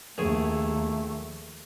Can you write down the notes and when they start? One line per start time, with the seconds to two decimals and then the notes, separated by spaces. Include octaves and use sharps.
0.18 A#1 D#2 A3 G#4